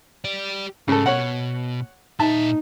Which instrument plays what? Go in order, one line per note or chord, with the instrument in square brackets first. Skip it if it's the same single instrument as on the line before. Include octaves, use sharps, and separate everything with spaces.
[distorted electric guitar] G4 D5
[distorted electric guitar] G#2 [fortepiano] C#3 A4
[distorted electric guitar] B2 [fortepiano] C#5 F#5
[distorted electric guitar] A#2 E5 [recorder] D#4 [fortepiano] A5